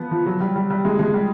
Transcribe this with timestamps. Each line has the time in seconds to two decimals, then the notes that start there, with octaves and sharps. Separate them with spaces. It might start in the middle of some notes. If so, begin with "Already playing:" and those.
Already playing: F3 B3
0.11 F3
0.26 F#3
0.40 G3
0.56 G3
0.70 G3
0.85 G#3
0.99 G#3
1.14 G3